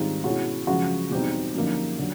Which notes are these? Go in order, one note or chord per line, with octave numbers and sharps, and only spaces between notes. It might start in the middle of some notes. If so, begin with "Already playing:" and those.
Already playing: G#2 D#3 G3 C4 D#4 F4
B2 G#3 C#4 E4 F#4
F#2 C#3 F3 G#3 F#4
E2 B2 G3 C4 D#4 G4
F#2 D3 F3 A#3 D#4
D3 F#3